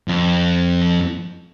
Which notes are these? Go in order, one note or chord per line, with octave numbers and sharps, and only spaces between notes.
F2